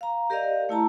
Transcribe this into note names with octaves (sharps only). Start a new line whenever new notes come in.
F5 A#5
G4 A#4 D5 D#5 F5
A3 E4 A5 A#5